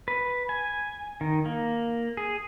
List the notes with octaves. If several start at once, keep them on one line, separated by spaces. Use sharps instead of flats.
B4
G#5
D#3
A#3
G#4